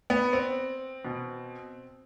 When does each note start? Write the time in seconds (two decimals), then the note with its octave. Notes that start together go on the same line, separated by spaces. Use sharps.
0.10 B3
0.33 C4
1.05 B2